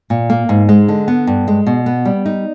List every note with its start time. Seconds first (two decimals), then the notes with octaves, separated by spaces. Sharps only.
0.10 A#2
0.30 A#3
0.49 G#2
0.69 G#3
0.88 D3
1.08 B3
1.27 G2
1.48 G#3
1.67 B2
1.86 B3
2.05 G3
2.26 D#4